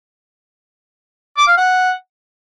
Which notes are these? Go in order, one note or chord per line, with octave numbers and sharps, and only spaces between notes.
D6
F5
F#5